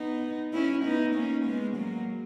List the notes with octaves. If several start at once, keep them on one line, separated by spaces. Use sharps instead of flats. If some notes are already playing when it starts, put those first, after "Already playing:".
Already playing: B3 D#4
C#4 E4
B3 D#4
A#3 C#4
G#3 B3
F#3 A#3